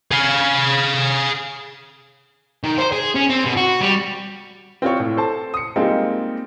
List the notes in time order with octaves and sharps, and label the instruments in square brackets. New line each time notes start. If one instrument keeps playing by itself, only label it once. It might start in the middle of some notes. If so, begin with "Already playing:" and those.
[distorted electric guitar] G#4 F5
D#3
C5
G#4
C#4
C4
B2
F#4
G3
[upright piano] C4 F4 C#5
A2
A4 C5 A5
D#6 C#7
G3 G#3 A#3 C4 D#4 F4